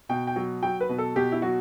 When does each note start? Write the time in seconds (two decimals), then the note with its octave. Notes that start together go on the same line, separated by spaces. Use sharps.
0.09 B2 G5
0.27 G5
0.36 F#3
0.63 F#3 G5
0.81 B4
0.89 B2
0.98 A4
1.16 B2 G4
1.32 E4
1.42 F#3 F#4